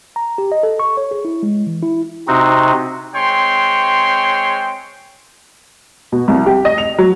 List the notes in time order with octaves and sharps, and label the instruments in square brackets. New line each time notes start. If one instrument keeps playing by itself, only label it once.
[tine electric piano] A#5
G4
D#5
A4
C#6
C#5
G#4
E4
G#3
E3
E4
[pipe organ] C3 C4 D#4 F#4
[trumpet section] G#3 C4 C#5 G5 C6
[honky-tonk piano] B2
C2
G4
D#5
F7
F#3